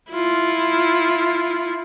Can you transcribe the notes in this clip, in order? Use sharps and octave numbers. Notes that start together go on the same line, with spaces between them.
E4 F4